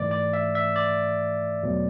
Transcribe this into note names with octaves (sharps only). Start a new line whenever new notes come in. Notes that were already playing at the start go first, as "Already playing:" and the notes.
Already playing: G#2 E3 A3 D5
D5
E5
E5
D5
E2 B2 F#3 A3